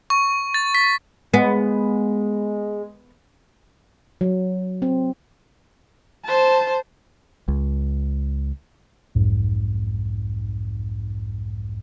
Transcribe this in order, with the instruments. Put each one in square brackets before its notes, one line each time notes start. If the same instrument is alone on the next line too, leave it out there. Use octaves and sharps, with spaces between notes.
[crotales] C#6
A6
B6
[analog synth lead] G#3 [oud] B3
[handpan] F#3
C4
[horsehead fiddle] C5 A5
[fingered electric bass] C#2
[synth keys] B1 F2 G#2